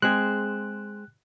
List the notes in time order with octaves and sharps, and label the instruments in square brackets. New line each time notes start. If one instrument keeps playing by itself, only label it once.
[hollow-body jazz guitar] G#3 C4 G#4 [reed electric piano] F#6